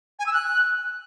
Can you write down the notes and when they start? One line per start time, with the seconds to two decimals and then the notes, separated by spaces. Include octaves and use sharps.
0.19 G#5
0.26 E6
0.33 F#6